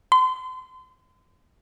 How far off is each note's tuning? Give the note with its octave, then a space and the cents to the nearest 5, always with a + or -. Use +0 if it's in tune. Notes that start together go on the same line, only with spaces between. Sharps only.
C6 -35